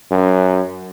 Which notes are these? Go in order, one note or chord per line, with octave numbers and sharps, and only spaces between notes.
F#2